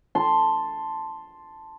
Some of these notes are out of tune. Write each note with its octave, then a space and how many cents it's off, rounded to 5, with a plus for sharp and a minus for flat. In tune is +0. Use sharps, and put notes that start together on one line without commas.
A5 +0 C6 +0